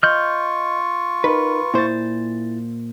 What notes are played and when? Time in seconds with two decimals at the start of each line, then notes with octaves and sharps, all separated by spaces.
0.03 F4 D#5 C#6 F6 G6
1.24 D#4 A#4 B4
1.74 A#2 E4 C5 A6